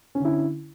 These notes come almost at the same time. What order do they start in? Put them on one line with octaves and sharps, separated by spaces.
C#4 D3 E4